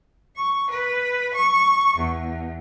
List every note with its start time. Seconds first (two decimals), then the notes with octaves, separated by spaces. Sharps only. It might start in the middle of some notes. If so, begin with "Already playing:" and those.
0.36 C#6
0.70 B4
1.33 C#6
1.97 E2